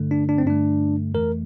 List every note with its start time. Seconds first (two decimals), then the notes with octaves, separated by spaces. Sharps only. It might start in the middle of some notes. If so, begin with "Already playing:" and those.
Already playing: G2 D3 A3
0.11 D4
0.29 D4
0.38 C4
0.46 G2 D3 A3 D4
1.15 F2 E3 A3 A#4